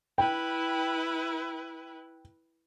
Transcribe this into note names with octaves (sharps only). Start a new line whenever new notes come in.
E4 B4 G5